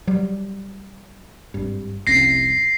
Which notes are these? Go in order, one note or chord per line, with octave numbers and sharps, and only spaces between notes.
F#3 G3
G#1 G2
F1 C2 C#4 A#6 C7